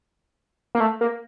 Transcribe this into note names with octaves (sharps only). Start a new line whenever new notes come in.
A#3
A3
A#3